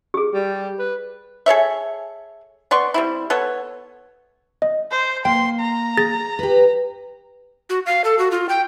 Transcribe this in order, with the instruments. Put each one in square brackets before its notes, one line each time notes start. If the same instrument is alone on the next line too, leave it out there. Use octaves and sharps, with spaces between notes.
[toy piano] G4 G#4
[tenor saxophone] G3
B4
[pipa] G#4 A4 C#5 E5
B3 D5 C6 C#6
G3 C4 E4
B3 A4 C#5
[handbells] D#5
[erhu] C5
[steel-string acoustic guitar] A#3 [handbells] G5 [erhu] C6
[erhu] A#5
[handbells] G#4 A6 A#6
[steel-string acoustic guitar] G4 B4
[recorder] F#4
F5
A4
F#4
F4
G5